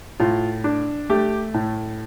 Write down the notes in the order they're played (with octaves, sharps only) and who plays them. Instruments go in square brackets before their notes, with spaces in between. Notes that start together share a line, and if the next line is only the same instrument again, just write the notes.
[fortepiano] A2 F4
D4
A3 G4
A2